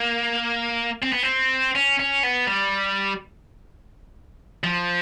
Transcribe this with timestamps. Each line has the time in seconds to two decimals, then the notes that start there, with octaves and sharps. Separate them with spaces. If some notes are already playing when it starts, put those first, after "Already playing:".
Already playing: A#3
1.03 C4
1.13 B3
1.23 C4
1.75 C#4
1.99 C#4
2.23 B3
2.47 G3
4.64 F3